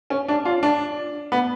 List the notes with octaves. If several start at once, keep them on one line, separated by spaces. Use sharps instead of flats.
C#4
D4
F4
D4
B3